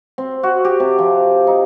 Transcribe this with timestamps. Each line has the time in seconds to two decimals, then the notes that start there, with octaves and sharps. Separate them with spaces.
0.18 C4
0.43 F#4
0.65 G4
0.80 C3
0.99 F3
1.47 D#4